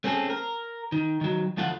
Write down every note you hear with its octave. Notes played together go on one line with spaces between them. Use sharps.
A3 C4 C#4 G#4 A4
A#4
D#3
D#3 F#3
D2 F3 A3 F4 F5 F#5